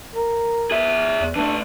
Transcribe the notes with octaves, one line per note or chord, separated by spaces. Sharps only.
A#4
G#4 E5
E2
E3 A3 D4